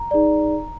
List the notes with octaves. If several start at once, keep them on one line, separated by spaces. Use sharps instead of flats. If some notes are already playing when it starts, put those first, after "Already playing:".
Already playing: A#5
D#4 G#4 D5